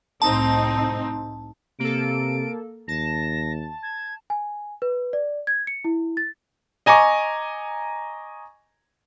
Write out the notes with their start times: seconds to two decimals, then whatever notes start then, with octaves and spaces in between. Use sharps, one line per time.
0.22 C2 A2 C4 D#4 A5
1.79 C3 A#3 A4 D7
2.88 D#2 A5 A#6
3.83 G#6
4.30 G#5
4.82 B4
5.13 D5
5.47 G#6
5.67 C#7
5.85 E4
6.17 A6
6.86 D#5 G#5 A#5 C#6 D6